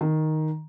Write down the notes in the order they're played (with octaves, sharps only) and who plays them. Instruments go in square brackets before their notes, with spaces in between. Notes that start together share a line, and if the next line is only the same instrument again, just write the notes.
[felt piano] D#3